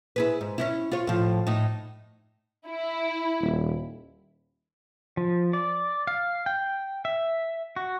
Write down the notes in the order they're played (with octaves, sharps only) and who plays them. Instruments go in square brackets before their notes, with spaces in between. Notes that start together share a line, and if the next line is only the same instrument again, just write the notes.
[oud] E4 G#4 B4
G#2
C#4 D4 E4
F4 C#5
A2 F3
A2 D#4
[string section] E4
[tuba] D#1
[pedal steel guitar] F3
D5
F5
G5
E5
F#4